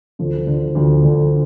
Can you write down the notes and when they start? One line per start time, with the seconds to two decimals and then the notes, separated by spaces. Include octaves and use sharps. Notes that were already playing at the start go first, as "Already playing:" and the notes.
0.19 D2 D3 F3
0.47 D2 D3 F3
0.75 D2 D3 F3
1.03 D2 D3 F3